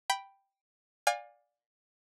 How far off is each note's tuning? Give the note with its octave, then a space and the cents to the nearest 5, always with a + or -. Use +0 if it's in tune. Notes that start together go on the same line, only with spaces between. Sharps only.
G5 +0 B5 +0
D5 +0 F5 +30 G#5 -30